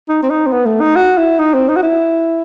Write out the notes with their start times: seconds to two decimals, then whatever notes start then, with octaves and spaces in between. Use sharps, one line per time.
0.09 D#4
0.23 C4
0.30 D#4
0.47 C4
0.52 B3
0.66 A3
0.81 D#4
0.96 F#4
1.18 E4
1.39 D#4
1.54 C4
1.69 D#4
1.76 F#4
1.83 E4